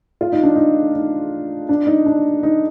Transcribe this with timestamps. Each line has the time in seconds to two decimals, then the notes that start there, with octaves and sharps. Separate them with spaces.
0.21 F4
0.32 D#4
0.43 D4
0.56 D#4
0.95 D#4
1.69 D4
1.87 D#4
2.06 D4
2.43 D#4